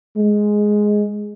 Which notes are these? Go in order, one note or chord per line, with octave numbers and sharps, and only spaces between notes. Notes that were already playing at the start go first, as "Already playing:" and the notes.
G#3